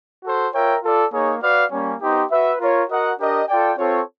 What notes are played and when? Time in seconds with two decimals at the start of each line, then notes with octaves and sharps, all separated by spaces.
0.23 F#4 A4 C5
0.53 F4 A#4 C#5 E5 G5
0.82 F4 A4 D5
1.12 A#3 D#4 G#4 C#5
1.41 F#4 B4 D5 F5
1.71 G3 A#3 C#4
2.01 B3 D#4 G4 C5
2.30 F#4 B4 E5
2.59 F4 A#4 C#5
2.89 F#4 A#4 D#5 F#5
3.18 D4 G4 A#4 D#5
3.48 F4 A4 D5 G5
3.77 C4 F4 A4 C#5